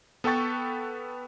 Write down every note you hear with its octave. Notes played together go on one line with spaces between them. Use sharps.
B3 A4 B4 G5 C#6 A6